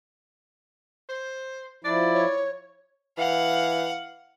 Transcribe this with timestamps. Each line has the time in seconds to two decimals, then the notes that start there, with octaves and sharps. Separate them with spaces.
1.09 C5
1.84 F3 E4 D5
2.14 C#5
3.18 E3 F5 F#5